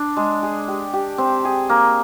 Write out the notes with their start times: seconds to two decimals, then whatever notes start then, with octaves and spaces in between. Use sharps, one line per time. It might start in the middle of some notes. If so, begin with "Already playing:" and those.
Already playing: D4
0.17 G#3
0.43 G#4
0.68 G4
0.94 G4
1.18 C4
1.45 G#4
1.69 A#3